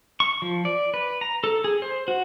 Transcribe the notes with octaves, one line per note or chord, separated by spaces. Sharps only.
C#6
F3
D5
B4
A#5
A4
G#4
C5
F#4